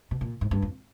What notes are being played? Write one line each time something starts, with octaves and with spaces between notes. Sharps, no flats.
B2
A#2
G#2
G2
F2